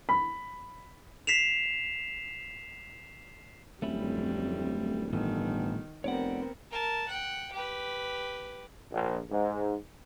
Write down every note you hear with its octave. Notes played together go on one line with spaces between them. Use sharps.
B5
B6 C7 E7 F7
D1 F2 G3 A3 C#4 E4
G1 A2 D#3 E3 A3
F1 B3 C4 A#4 C#5 D5 F#5
A#4 A5
F#5 G5
G4 B4
A#1
G#2